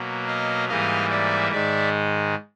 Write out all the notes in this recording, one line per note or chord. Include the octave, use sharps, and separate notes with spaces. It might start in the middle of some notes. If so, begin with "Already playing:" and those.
Already playing: B2 F#3 A#3
D#5 F5
G#2 E3 G3 A#3 D#5 F5
D5 E5
G#2 D#3 G#3 D5 E5